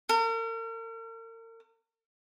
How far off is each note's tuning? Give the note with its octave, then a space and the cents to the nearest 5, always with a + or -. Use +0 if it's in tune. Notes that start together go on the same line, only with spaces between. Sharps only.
A#4 -40